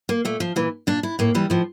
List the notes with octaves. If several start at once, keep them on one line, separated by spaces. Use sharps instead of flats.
A#3
A#2 A3
F3
A#2 E3
A#2 D4
E4
A2 A#3
E3 G3
A2 F3